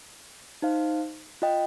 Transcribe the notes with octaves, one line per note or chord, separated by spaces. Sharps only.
D#4 C5 F5
F4 D#5 G5